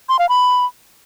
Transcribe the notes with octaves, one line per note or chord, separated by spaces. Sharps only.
C6
F5
B5